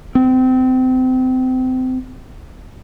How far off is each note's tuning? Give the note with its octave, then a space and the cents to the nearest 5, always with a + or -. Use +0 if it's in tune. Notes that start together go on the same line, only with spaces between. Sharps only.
C4 -30